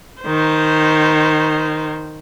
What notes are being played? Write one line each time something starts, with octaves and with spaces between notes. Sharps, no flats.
D#3 C5